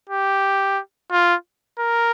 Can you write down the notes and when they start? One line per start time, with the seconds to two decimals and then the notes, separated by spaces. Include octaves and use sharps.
0.09 G4
1.11 F4
1.79 A#4